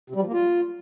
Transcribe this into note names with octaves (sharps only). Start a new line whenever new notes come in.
C3
G3
F3
A#3
F4